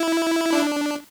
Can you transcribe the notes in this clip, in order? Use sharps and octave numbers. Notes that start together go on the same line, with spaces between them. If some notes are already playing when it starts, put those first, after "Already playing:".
Already playing: E4
D4